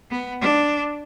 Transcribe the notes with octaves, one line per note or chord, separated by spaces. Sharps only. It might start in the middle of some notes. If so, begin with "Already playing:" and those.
B3
D4